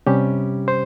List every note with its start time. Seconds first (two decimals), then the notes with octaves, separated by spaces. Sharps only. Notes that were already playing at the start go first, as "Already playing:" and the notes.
0.07 C3 G3 C#4 G4
0.68 C5